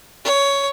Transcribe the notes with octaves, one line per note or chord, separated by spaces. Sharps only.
C#5